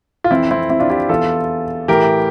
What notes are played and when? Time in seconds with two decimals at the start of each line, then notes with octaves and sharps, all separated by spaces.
0.24 F4
0.30 F2 E3 C4 E4
0.51 C4 E4
0.70 C4 E4
0.80 D4 F4
0.90 E4 G4
1.09 E2 E3 F4 A4
1.88 A2 E3 G4 A#4